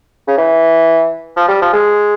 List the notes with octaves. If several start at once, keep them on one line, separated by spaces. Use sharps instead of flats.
C#3
E3
F3
G3
F3
G#3